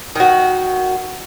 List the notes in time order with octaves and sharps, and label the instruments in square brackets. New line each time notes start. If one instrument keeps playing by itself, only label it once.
[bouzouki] D#3 F#4